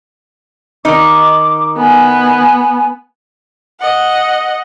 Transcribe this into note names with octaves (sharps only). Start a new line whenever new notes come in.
D#3 D#4 D6
B3 G#5
D#5 F#5